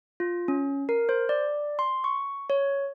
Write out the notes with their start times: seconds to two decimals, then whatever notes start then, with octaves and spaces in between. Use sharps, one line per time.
0.20 F4
0.48 C#4
0.89 A#4
1.09 C5
1.29 D5
1.79 C6
2.04 C#6
2.50 C#5